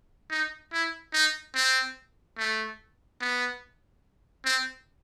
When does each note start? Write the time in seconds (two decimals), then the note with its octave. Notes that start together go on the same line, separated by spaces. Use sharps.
0.30 D#4
0.73 E4
1.13 D#4
1.55 C4
2.38 A3
3.21 B3
4.45 C4